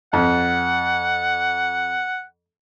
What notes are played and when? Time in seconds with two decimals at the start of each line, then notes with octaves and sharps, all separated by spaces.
0.13 F2 F#5